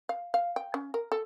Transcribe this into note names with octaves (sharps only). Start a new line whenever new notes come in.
F5
F5
G5
C#4
A#4
A4